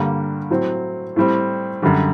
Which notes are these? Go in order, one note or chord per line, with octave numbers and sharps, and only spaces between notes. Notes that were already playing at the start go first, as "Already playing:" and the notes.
Already playing: G2 D3 G3 A#3
A2 F#3 C4
A2 G3 C4
F#2 D3 G3